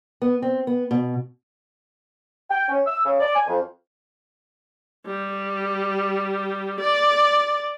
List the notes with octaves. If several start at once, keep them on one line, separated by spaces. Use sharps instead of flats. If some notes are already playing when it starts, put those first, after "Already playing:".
B3
C4
B3
B2
G5
C#4
E6
C#3
D5
G#5
F2
G3
D5